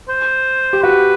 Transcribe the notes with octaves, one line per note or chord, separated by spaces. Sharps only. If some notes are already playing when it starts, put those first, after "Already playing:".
C5
G4
F#4 B4